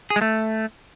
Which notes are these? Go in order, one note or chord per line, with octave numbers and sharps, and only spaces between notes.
G#4
G#3
A3